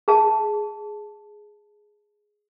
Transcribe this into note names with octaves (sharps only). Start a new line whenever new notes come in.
G#4 A5